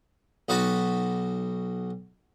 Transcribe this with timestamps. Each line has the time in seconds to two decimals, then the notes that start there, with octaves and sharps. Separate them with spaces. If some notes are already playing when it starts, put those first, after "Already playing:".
0.49 B1 D#4 F#4 B4 A5 B5